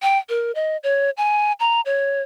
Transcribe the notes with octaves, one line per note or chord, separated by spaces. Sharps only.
G5
A#4
D#5
C#5
G#5
A#5
C#5